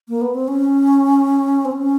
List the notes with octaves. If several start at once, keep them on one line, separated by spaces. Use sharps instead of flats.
A#3
B3
C4
C#4
C4
C#4